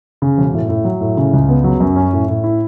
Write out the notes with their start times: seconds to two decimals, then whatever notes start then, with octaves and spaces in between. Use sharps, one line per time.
0.22 C#3
0.38 E1
0.54 A2
0.69 A2
0.84 F#3
1.01 A2
1.17 C#3
1.33 C#2
1.49 B3
1.64 F#3
1.80 F#2
1.96 C#4
2.13 A2
2.28 A2
2.44 E4